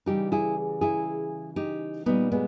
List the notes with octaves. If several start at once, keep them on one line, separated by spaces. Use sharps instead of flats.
C#3 E3 G3 D#4 G4
E4 G#4
E4 G#4
D#4 G4
A#2 G3 B3 D#4
G#3 B3